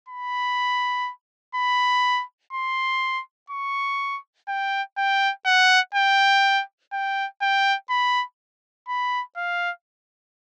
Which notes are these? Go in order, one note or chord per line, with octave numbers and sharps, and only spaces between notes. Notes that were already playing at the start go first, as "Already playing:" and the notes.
B5
B5
C6
C#6
G5
G5
F#5
G5
G5
G5
B5
B5
F5